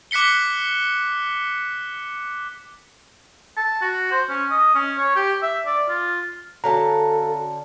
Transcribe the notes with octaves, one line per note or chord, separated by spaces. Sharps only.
D6 F#6 B6 C#7 G7
A5
F#4
C5
C#4
D#5
C#4
C#5
G4
E5
D5
F4
D3 C#4 F#4 A4 F5 A5 A#5